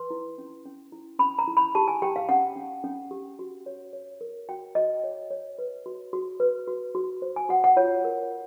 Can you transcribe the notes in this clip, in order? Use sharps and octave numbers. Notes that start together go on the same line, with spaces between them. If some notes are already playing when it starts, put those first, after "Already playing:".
Already playing: B4 C6
E4
C#4
C#4
E4
C#4 B5
A#5
E4
B5
G4 A5
G#5
G4 G5
F5
C#4 F#5
C#4
C#4
G4
F#4
C#5
C#5
A#4
F#4 G5
F#4 D#5
C#5
C#5
B4
F#4
F#4
B4
F#4
F#4
C5
G#5
F#4 F#5
F#5
F4 C#5
A#4